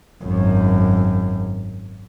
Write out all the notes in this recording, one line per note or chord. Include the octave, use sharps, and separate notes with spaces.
G#1 F#2